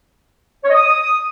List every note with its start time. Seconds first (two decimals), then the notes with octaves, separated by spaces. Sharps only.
0.64 C#5
0.69 D#5
0.75 D#6